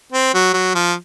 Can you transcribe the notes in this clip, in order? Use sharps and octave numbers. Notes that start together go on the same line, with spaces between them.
C4
F#3
F#3
F3